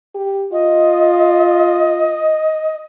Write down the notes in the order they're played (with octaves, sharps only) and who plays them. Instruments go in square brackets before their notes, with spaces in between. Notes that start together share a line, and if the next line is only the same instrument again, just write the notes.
[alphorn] G4
[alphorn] F4 [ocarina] D#5